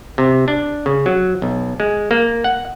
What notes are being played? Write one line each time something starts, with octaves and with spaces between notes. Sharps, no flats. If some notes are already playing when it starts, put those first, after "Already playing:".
C3
D4
C#3
F#3
B1
G#3
A#3
F#5